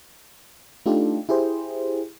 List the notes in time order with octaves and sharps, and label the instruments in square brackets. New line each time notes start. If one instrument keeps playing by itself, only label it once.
[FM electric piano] A3 D4 D#4 F4 G4 A4
E4 G4 G#4 C5